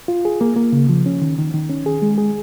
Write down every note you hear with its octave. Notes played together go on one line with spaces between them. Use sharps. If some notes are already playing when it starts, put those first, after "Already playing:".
F4
G#4
A#3
A#3
C#3
F3
C#4
D#3
D#3
D#3
C#4
G#4
G#3
G#4